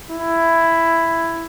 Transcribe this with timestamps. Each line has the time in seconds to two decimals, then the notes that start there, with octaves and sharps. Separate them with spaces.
0.11 E4